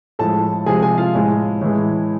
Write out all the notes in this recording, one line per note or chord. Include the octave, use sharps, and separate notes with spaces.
A2 F3 G#3 A4 A5
C3 F3 G#3 G#4 G#5
G#4 G#5
F4 F5
A2 G#3
A2 E3 G#3